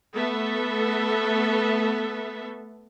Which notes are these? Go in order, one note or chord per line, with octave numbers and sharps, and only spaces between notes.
A3 B3 A4 E5